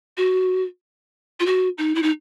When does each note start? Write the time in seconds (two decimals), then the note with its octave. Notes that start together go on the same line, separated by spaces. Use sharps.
0.17 F#4
1.40 F4
1.46 F#4
1.78 D#4
1.95 E4
2.03 D#4